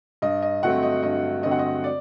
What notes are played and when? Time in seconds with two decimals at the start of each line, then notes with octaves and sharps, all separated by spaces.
0.22 G2 D#5
0.42 D#5
0.62 D3 F#3 A3 C4 F#5
0.83 D#5
1.03 G2 D#5
1.43 D3 F#3 A3 C4 D#5
1.51 F#5
1.59 D#5
1.84 D5